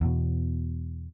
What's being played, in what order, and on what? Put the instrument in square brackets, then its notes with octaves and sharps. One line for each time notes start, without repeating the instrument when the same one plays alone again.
[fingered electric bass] E2 B2